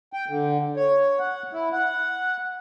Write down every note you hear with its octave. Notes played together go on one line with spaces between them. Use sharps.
G5
D3
C#5
F#5
E4
F#5